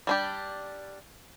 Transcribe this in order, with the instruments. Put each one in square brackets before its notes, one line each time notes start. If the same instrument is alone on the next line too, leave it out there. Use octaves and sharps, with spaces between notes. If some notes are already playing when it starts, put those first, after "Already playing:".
[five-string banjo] G3 D4 G4